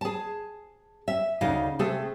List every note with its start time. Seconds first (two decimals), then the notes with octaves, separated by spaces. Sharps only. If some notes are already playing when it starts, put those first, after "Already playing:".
0.01 G#4 A5
1.08 E5
1.41 D2 C#3 D#4 D#5 F5
1.79 C3 A3 G#4 A4